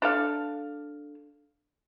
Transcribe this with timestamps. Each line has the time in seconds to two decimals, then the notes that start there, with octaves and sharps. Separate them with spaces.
0.02 D4 A4 F5